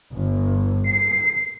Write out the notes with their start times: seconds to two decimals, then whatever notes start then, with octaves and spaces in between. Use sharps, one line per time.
0.13 G1
0.87 C7